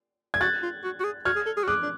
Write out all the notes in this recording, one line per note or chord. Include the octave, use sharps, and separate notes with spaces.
G#6
F#4 F#6 A6
F4
F#4
F#4
G#4
F#4 F6 G#6
G#4
A4
G#4
F#4
G#4 D6 F#6
D4